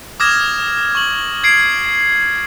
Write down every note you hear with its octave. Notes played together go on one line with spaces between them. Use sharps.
D6 D#6 F6 G#6 A#6 E7
C#6 F#7
G#6 C7 D7